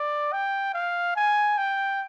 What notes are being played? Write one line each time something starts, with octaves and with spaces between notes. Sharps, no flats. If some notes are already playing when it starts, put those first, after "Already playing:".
Already playing: D5
G5
F5
G#5
G5